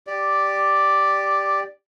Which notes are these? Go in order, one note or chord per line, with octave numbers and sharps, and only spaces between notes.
G4 D5